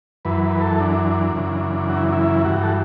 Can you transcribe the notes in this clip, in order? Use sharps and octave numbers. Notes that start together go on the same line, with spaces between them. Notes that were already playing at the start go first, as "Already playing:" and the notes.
F#2 E3 B4
B4
A4
D4
F#2 C#3 E3
F#4
E4
D4
E4
G2 E3 F#4
A4